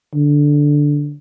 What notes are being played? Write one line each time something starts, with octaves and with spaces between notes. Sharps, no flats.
D3